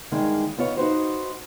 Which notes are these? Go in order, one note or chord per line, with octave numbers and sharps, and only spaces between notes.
E2 G2 D#3 G#3 A#3
D#2 B3 F4 C#5
D#4 F#4 B4 C5